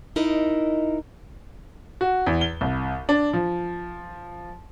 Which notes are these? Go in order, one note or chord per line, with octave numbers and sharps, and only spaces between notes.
D#4 E4 A#4 D#5
F#4
E2
G7
C2
D4
F3